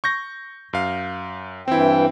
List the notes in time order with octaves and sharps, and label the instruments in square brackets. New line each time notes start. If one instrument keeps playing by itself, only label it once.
[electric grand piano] C#6 G6 A#6
F#2 F5
[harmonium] G2 E3 G5 [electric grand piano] C4 E4